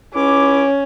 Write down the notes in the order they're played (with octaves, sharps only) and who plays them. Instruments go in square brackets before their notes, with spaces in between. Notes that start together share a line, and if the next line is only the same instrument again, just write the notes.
[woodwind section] C#2 E4 D6 [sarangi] C#4